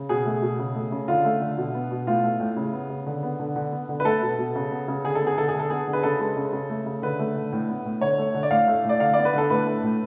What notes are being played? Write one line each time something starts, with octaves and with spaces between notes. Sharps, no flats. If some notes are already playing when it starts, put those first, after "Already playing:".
Already playing: C#3
B2 G#4
A3
B2
C#3
A3
C#3
D3 F4
A3
D3
B2
B3
B2
A2 F4
A3
A2
C#3
B3
C#3
D3
B3
D3
D3
B3
D3
B4
A3 A4
B2
B2
C#3
B3
C#3
D3 G#4
A4
B3
G#4
D3 A4
G#4
D3
A4
B3 G#4
D3
B4
C#3 A4
G#3
C#3
C#3
A3
C#3
D3 B4
A3
D3
A2
B3
A2
D3 C#5
A3
D3
D5
A2 F5
A3
A2 D5
D3 F5
B3 D5
B4
D3 A4
A2 B4
A3
A2